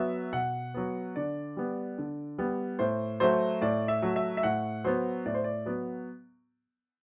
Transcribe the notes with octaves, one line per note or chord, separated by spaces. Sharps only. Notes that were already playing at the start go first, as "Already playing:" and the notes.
Already playing: F#3 B3 E5
B2 F#5
F#3 B3
D3 D5
G3 B3
D3
G3 B3
A2 C5
F#3 A3 C5
A2 D5
E5
F#3 A3
E5
E5
A2 F#5
F#3 B3 C5
A2 D5
C5
D5
F#3 B3